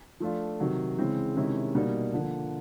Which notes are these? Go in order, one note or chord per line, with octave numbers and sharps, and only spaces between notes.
F3 A3 D4 F4
C3 D#3 F#3
C#3 E3 G#3 C4
C3 D#3 G#3 C#4 E4
B2 G3 A#3 D#4
D3 F3 A#3